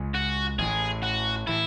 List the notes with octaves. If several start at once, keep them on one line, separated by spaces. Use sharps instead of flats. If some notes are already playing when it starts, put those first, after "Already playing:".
Already playing: C#2 C#3 G#3
F#4
A1 A2 E3 G#4
F#4
A2 E3 E4